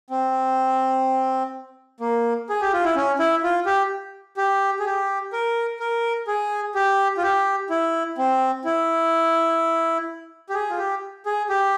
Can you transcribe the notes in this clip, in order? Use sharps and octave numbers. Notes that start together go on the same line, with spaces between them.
C4
A#3
G#4
G4
F4
E4
C#4
E4
F4
G4
G4
G#4
G4
A#4
A#4
G#4
G4
F4
G4
E4
C4
E4
G4
G#4
F4
G4
G#4
G4